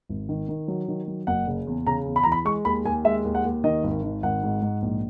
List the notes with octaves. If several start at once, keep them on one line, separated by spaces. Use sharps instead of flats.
G#1
D#3
D#3
F#3
D#3
F#3
F#1 F#5
C#3
E2
C#3 A#5
E2
B5
E3 A#5
B5
G#3 C#6
D#2 B5
D#2 G#5
G#3 E5
D#2
F#5
D#2
D#3 D#5
G#1
D#3
G#1 F#5
G#2
G#2
A#1